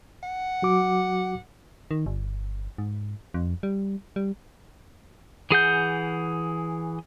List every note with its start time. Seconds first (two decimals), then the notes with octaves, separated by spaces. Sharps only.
0.23 F#5
0.62 F#3 F#4 D6
1.91 D#3
2.06 G1
2.78 G#2
3.34 F2
3.63 G3
4.16 G3
5.51 E3 G#4 F#5 G6